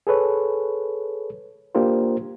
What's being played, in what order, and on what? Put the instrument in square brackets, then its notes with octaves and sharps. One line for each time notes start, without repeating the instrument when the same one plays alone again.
[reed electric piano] G#4 A4 B4 C#5
A#3 D4 F4 G4 A#4 C5